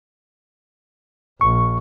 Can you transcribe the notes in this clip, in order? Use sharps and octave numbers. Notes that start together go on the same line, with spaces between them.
A#1 C#6